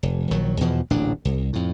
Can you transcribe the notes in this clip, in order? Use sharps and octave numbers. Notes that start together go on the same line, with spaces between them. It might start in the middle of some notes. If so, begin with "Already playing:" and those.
F1
A#1 D#3 F#3
E2 B2 E3 F3
D1 A1 A#2 D4
C2
F2 A2